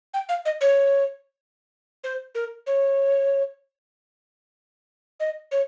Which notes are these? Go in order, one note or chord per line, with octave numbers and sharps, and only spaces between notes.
G5
F5
D#5
C#5
C5
A#4
C#5
D#5
C#5